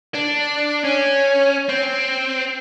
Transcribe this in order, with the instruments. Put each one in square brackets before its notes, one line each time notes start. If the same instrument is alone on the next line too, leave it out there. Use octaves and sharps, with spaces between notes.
[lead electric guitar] D4
C#4
C4